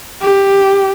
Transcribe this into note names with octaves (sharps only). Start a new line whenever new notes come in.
G4